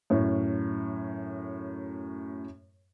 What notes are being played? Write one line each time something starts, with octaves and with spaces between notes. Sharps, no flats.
F#2 A2 C#5